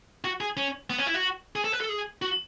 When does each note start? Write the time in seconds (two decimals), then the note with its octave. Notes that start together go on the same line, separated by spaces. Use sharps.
0.24 F#4
0.40 G#4
0.57 C#4
0.90 B3
0.98 C#4
1.07 E4
1.14 F#4
1.56 G#4
1.64 A4
1.72 B4
1.81 A4
1.89 G#4
2.22 F#4